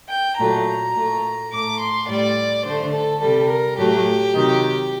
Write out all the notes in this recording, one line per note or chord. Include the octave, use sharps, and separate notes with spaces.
G5
A#2 F#3 A3 A#5
A#2 A3
A2 A3 D6
C6
A2 G3 D5
D3 A3 C5
A4
C3 G3 A4
A#4
A2 F#3 A3 G4
C3 D#3 F#3